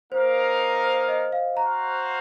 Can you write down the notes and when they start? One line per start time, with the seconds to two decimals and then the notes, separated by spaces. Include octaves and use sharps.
0.11 A#3 D#4 A#4 C5 F5
0.84 C5
1.08 D#5
1.32 F5
1.57 F#4 C5 F5 A#5